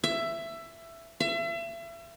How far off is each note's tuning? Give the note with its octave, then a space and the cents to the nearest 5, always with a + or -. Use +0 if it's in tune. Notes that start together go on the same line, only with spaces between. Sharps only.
E5 +15
E5 +35